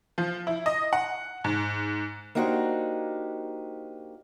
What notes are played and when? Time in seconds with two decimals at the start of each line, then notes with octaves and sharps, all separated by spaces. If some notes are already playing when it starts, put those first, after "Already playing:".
0.18 F3
0.47 E4
0.66 D#5
0.93 F#5
1.44 G#2
2.35 A#3 D4 D#4 F#4 G4 C5